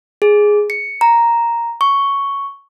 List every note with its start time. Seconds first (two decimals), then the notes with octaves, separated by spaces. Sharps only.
0.22 G#4
0.70 C#7
1.01 A#5
1.81 C#6